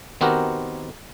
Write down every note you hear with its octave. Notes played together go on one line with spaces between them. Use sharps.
D#3 B3 C4 F#4 G4 A#4